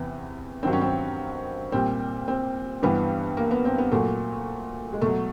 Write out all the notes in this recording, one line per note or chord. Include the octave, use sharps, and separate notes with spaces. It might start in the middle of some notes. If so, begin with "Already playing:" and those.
Already playing: E2 C3 E3 B3
G2 D#3 F#3 C4
C#4
C4
A#2 G3 C4
C4
G2 E3 G3 B3
A#3
B3
C4
B3
A#2 F#3 A3
G#3
B2 F#3 A3